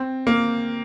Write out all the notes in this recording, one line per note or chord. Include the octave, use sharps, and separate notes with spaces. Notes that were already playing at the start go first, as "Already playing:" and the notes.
Already playing: C4
A#3